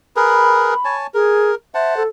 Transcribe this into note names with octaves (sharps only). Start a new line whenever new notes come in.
G#4 A#4 B4 B5
C#5 G#5 A5
G#4 A#4
C5 E5 F#5 A5
A4